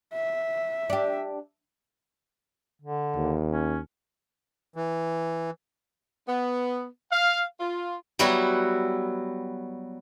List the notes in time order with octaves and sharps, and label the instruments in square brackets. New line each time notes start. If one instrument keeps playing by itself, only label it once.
[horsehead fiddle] E5
[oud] D4 G4
[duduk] D3
[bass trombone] D#2
[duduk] C#4
[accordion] E3
[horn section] B3
F5
F4
[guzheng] F#3 G3 B3 E4 F#4